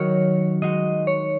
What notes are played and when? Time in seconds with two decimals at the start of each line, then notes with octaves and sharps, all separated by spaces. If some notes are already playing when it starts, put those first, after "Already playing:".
Already playing: D#3 F#3 D#4 F#4 C#5
0.62 G#3 D#4 F#4 D#5
1.07 C#5